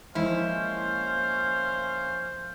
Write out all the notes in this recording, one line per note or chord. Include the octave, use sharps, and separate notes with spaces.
F3 G#3 A#3 C#4 E4 C5 F5